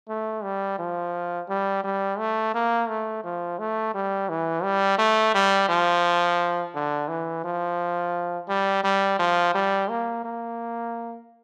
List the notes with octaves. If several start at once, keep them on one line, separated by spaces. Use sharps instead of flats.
A3
G3
F3
G3
G3
A3
A#3
A3
F3
A3
G3
E3
G3
A3
G3
F3
D3
E3
F3
G3
G3
F3
G3
A#3
A#3